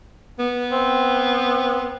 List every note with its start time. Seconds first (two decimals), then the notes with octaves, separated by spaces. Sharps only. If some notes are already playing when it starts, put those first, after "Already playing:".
0.39 B3
0.71 C4